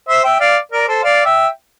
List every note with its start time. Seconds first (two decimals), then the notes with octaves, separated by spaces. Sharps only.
0.08 C5 E5
0.24 E5 G5
0.40 D5 F5
0.72 A#4 D5
0.88 A4 C5
1.03 D5 F5
1.25 E5 G5